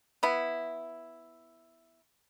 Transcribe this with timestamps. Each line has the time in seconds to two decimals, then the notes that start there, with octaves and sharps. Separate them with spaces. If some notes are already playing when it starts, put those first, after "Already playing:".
0.23 B3 E4